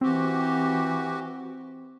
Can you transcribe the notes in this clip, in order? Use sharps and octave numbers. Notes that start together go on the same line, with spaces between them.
E3 C4 F#4 G4